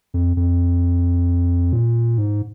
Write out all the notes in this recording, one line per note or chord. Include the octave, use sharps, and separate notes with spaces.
F2
F2
A#2
G#2